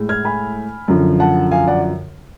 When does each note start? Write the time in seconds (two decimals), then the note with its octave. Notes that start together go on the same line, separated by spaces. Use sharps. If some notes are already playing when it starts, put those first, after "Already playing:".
Already playing: A2 G#3
0.09 F6 G#6
0.24 G#5 B5
0.88 F#2 D3 F3
1.20 F#5 A5
1.51 F5 G#5
1.67 D5 F#5